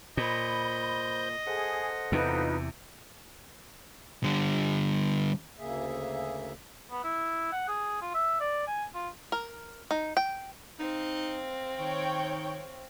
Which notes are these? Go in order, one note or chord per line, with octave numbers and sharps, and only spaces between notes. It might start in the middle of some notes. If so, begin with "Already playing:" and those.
A#2 C5 D#5 B5 G6
G#4 A4 C5 F#5
E2 C3 D#4 F4 B4
D3 G3
D2 C#3 A#3 G#4 E5
B3
E4
F#5
G#4
F4
E5
D5
G#5
F4
A#4
D#4
G5
C4 D#4 F5
D#3 C#5 G5